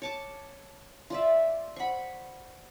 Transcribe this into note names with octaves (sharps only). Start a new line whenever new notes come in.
C#5 A5 D6
F4 D5 E5
C5 F#5 B5 C#6